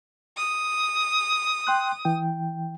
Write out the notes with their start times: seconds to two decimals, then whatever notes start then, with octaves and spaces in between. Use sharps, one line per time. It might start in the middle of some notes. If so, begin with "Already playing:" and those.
0.37 D#6
1.67 G5 C6 F#6
2.05 E3 G5